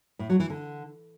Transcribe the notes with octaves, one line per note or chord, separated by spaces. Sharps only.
A2
F#3
E3
D3